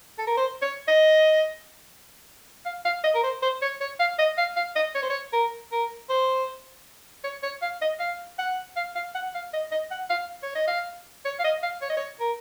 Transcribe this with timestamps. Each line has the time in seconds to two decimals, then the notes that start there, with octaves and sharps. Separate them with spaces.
0.18 A4
0.27 A#4
0.37 C5
0.62 C#5
0.88 D#5
2.66 F5
2.85 F5
3.04 D#5
3.15 A#4
3.24 C5
3.43 C5
3.62 C#5
3.81 C#5
4.00 F5
4.19 D#5
4.38 F5
4.57 F5
4.76 D#5
4.95 C#5
5.03 C5
5.10 C#5
5.33 A#4
5.72 A#4
6.10 C5
7.24 C#5
7.43 C#5
7.62 F5
7.81 D#5
8.00 F5
8.39 F#5
8.76 F5
8.96 F5
9.15 F#5
9.35 F5
9.54 D#5
9.72 D#5
9.91 F#5
10.10 F5
10.43 C#5
10.56 D#5
10.68 F5
11.25 C#5
11.39 F5
11.44 D#5
11.63 F5
11.82 C#5
11.90 D#5
11.97 C#5
12.20 A#4